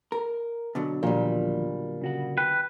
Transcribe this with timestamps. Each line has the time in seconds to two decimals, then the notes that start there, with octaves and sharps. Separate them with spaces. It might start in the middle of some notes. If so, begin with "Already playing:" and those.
0.12 A#4
0.75 B2 D3 F#3
1.03 D#2 A#2 F3 G3
2.01 C#3 F#4 F#5
2.38 B4 G5